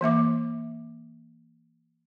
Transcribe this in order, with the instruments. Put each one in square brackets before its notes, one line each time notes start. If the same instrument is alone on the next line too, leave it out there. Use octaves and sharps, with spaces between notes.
[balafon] E3 A#3 E5 D6